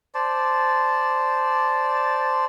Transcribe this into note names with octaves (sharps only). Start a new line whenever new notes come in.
C5 D5 A5